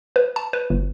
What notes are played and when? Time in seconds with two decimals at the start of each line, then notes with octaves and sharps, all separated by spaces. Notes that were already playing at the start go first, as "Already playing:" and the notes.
0.16 B4
0.36 A5
0.53 B4
0.70 G1